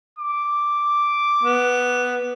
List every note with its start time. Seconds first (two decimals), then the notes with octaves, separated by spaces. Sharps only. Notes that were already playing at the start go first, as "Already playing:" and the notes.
0.18 D6
1.44 B3